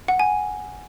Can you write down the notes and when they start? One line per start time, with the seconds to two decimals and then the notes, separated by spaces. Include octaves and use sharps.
0.08 F#5
0.19 G#5